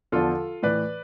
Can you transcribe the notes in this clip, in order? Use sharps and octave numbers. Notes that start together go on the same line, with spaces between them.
E2 D3 F3 F4 A4
A2 E3 B4 D5